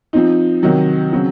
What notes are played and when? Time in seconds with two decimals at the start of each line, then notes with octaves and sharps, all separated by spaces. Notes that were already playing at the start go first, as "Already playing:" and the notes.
0.13 F3 C4 D#4
0.63 C3 D#3 F#3
1.13 C#3 F#3 C4 F#4